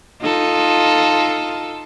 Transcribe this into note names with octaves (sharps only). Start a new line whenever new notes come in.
D#4 F4 A4